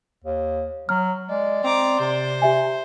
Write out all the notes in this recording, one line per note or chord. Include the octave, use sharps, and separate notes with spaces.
D#2
F#3 F6
G#3 D5
C4 A#5 D6
C3 C5
G4 E5 G#5